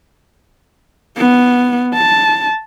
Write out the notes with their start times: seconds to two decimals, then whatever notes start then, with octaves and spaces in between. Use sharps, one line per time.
1.17 B3
1.95 A5